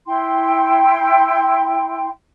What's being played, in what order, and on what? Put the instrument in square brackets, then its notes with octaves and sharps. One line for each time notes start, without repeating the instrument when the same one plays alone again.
[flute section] E4 G5 C6